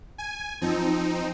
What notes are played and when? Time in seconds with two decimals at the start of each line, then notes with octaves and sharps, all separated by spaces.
0.18 G#5
0.61 F3 C4 D#4